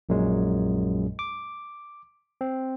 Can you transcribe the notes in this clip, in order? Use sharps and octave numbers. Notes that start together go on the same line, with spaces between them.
A#1 F#2 A#2 F#3 G#3
D6
C4